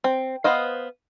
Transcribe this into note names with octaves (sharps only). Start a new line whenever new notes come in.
C4
B3 C5 D#5 F5